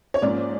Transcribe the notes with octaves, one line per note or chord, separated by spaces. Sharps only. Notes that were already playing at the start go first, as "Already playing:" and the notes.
C#5
G#2 F3 A#3 C#4 D5